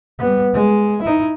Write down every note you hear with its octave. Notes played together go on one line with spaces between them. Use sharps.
G3 B3
G#3
D#4 E4